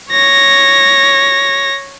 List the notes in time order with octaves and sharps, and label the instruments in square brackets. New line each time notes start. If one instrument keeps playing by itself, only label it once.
[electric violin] C#5 A#6